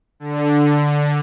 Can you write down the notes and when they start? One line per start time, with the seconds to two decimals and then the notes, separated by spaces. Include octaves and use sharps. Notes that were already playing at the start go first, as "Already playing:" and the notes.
0.20 D3